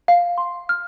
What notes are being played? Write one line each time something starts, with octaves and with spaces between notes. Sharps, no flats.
F5
C6
F6